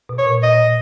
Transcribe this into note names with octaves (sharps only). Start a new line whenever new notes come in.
B2
C#5
A#2
A#2 D#5